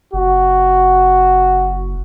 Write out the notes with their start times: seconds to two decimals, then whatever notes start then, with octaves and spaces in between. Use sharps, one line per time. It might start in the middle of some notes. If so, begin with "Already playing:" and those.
0.13 F#1 F#4